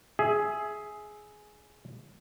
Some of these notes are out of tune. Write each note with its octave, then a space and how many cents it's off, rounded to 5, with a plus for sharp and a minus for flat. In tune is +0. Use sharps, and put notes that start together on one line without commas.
G#4 +10 E5 +0